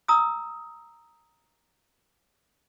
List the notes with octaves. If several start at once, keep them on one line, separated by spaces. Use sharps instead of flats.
A#5 D#6 E6